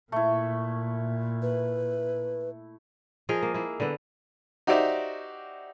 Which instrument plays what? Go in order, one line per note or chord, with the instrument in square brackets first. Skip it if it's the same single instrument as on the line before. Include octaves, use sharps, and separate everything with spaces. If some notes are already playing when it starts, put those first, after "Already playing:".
[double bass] A#2 [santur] A3 E4
[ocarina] B4
[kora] F3 G#4 A#4 D#5
A#3
A#3 E4
D3 B3
[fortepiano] D#4 F#4 G4 C5 D5 E5